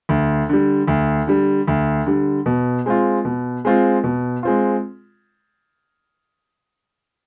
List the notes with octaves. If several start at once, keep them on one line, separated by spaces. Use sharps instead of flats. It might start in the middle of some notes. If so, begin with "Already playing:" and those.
D2
D3 G3
D2
D3 G3
D2
D3 G3
B2
G#3 C4 F4
B2
G#3 C4 F4
B2
G#3 C4 F4